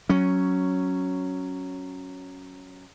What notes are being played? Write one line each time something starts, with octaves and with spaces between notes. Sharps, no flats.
F#3 C#4